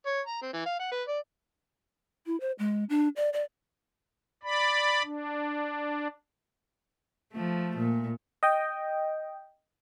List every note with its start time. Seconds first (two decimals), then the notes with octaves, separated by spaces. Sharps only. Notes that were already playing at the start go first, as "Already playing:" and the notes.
0.06 C#5
0.27 A#5
0.42 C4
0.53 E3
0.66 F5
0.79 F#5
0.92 B4
1.08 D5
2.26 E4
2.40 C5
2.59 G#3
2.89 D4
3.16 D5
3.33 D5
4.43 D5 B5
5.03 D4
7.33 F3 A3
7.77 A#2
8.43 D#5 G5